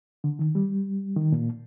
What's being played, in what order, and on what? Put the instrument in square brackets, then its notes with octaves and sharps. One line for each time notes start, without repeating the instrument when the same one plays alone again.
[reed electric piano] D3
D#3
G3
D#3
A#2